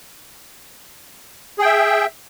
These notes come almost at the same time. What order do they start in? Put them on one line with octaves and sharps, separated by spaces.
G#4 G5 E5